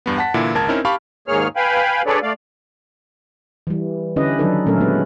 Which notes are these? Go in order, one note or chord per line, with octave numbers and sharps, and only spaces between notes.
E2 G2 B3
F#5 A5 B6
A#2 D3 E3 A#3 E4
G#1 C#2 A#4 A5 G#6
C4 C#4 D#4 E4 A#4
G4 F5 A5 B5 C#6 F6
D#2 G#2 A#3 G#4 C#5 F6
B4 F5 G5 G#5 B5
D4 G#4 A4 B4 C#5 D5
A3 D5 F5
E3 G3
D3 C#4 E4 G4 B4 D#5
D#3 F#3 D4 D#4 A4 B4
A#2 F#3 A3 C#4 A4 A#4
G#3 B3 C#4 B4